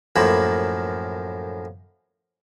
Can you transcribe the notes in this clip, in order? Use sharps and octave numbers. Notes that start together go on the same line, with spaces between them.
F#2 A2 F3 A#3 A5 B5